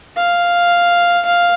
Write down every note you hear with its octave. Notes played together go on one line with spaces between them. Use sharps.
F5
F5